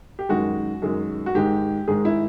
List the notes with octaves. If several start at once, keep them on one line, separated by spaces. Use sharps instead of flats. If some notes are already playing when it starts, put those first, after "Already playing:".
G4
F#2 D#3 G#3 F#4
F#2 D#3 G#3
F#4
G#2 D#3 G#3 G4
G#2 D#3 G#3 G#4
E4